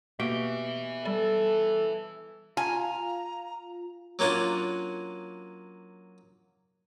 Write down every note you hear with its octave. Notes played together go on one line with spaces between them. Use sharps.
B2 A#3 G4 B4 E5 G5
G3 A4
F4 F5 G#5 A#5
F#3 A#3 C#4 D4 F4